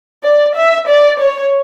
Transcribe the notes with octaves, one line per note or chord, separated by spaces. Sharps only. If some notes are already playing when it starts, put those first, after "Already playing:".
D5
E5
D5
C#5